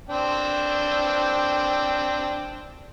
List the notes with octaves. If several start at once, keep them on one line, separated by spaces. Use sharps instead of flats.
C4 D4 G5